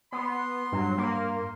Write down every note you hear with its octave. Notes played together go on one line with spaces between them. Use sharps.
B3 C6
G2 F#3
A#3